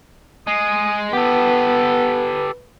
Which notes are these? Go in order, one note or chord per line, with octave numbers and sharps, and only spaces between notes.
G#3 D#6
B3 G4 A4 B4